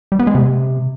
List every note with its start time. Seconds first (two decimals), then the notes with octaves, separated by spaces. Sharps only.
0.12 G3
0.19 B3
0.27 G#3
0.35 C3